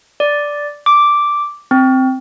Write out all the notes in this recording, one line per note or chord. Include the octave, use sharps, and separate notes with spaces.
D5
D6
C4